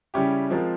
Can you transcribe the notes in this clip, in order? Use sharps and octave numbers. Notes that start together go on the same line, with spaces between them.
C#3 G3 C#4 E4 G4
F3 G#3 C4 F4 A#4